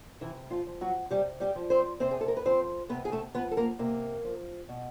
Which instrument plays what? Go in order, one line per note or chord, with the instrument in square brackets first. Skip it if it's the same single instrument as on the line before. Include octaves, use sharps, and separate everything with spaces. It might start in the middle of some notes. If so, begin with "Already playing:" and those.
[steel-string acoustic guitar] C3 E3 E4
F3 F4
F3
F#3 F#4
C3 G3 G4
G3 G4
F3
C4 C5
C3 C4 C5
G#4
A4
A#4
B4
F3 C4 C5
C3 B3 B4
G#4
A3 A4
F3 B3 B4
A4
A#3 A#4
C3 A#3 A#4
F3
B2